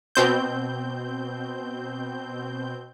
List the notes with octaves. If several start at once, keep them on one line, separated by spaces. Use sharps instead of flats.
B2 C4 G6